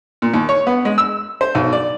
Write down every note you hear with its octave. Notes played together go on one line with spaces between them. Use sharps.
A#2
D#2
C#5
B3
G#3
E6
C5
B1
D5